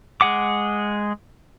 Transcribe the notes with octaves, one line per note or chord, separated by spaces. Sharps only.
G#3 G#4 F#5 D6